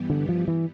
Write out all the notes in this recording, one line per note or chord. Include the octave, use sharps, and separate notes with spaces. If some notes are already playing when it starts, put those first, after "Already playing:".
Already playing: G2 E3 G3 B3
D3
F3
E3